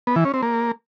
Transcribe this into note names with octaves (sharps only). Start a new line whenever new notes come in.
B3
E3
C#4
C4
A#3